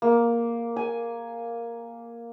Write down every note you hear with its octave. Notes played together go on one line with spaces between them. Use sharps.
A#3
G#5